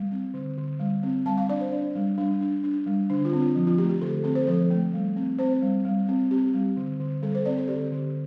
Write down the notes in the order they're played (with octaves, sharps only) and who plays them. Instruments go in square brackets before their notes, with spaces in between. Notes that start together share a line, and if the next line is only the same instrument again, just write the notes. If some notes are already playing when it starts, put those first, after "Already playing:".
Already playing: [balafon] G3
C4
D3
D3
G3
C4
G3 A5
F5
D4 D5
C5
D4
G3
G3 D4
D4
D4
G3
D3 D4
F4
C4
F4
F3
F4
A3 G4
G4
D3 A4
C4 A4
C5
F3 A4
A3
G3
C4
C4 C5
G3
G3
C4
C4 G4
G3
D3
D3
G3 A4
C5
C4 D5
A4
D3 G4
D3